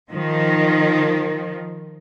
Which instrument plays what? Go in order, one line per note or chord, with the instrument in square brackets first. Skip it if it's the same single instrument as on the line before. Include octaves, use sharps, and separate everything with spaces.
[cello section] D#3 F3